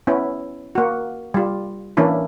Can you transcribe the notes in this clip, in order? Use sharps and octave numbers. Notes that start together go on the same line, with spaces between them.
B3 C#4 E4
A#3 F#4
G3 F4
E3 A#3 C#4 D4 E4